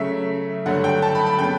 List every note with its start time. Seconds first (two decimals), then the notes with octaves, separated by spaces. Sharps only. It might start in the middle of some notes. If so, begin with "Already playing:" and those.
Already playing: C#3 F#3 A3 E5
0.65 G2 D3 F#3 A3 F#5
0.84 G5
1.02 A5
1.15 B5
1.26 B5
1.39 C#3 F#3 B3 G5